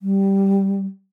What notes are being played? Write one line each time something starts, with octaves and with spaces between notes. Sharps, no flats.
G3